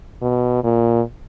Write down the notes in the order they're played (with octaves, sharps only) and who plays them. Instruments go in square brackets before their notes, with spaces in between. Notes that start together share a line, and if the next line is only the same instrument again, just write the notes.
[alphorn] B2
A#2